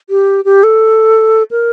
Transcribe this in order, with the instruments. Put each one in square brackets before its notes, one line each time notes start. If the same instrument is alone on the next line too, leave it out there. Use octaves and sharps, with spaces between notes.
[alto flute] G4
G4
A4
A#4